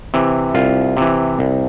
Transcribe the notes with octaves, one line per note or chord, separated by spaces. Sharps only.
C3 E3
C2 F4
C3 E3
C2